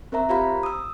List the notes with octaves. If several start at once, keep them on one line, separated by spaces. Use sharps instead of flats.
C4 A#4 C5 E5 A#5
F4 G4 C5 F5 A#5 B5
D#6 E6